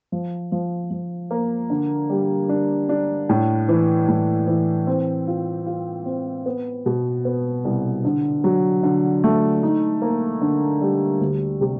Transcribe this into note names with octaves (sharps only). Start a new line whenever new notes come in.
F3
F3
F3
A#3
D3
G3
D4
D4
A2
E3
A2
E3
C4
F4
F4
C4
B3
B2
B3
C2
D3
F#3
D3
A3
D#4
A#3
D3
G3
D2
C3